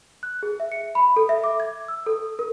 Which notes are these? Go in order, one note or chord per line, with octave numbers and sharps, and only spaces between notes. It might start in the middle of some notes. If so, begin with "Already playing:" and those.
F#6
G#4
E5
C#7
B5
A4
E5
D6
G#6
E6
A4
A#4